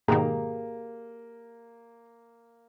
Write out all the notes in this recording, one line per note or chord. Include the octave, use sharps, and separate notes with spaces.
G#2 B2 D#3 A#3 G4 G#4 A#5